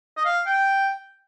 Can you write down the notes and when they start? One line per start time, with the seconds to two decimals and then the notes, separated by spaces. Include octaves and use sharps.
0.17 D#5
0.25 F5
0.46 G5